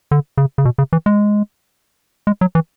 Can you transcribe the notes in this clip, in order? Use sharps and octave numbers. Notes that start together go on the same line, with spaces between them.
D3
C#3
C#3
B2
C#3
E3
G#3
G#3
F#3
E3